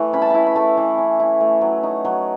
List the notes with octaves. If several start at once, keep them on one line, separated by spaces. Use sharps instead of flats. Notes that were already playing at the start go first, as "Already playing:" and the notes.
Already playing: E3 A3
C#4 B5
A5
E4 B5
B5
A3 A5
E3
C#4
E4
A3
F#3
D#4
F#3